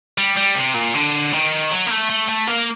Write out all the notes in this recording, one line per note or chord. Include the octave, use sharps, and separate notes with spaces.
G3
G3
C3
A#2
D3
D#3
F#3
A#3
A3
A3
A3
A#3